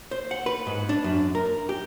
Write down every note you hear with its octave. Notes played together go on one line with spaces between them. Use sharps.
C5
F#5
B4
G#2
D4
F#2
A#4
G4